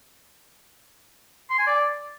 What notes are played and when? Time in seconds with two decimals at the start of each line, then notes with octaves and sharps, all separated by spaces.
1.50 C6
1.58 G#5
1.67 D5